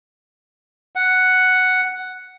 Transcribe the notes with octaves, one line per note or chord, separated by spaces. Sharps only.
F#5